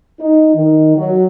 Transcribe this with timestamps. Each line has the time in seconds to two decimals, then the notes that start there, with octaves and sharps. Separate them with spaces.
0.20 D#4
0.55 D#3
0.97 F#3